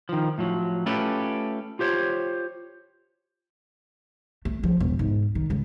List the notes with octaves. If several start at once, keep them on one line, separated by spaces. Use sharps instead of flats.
D#3 F3
A2 F3 F#3
A3 C#4 F4 G4 A4 B4
F4 G4 C5 C#5
A3
F3
E1
G#2
D#3
C#2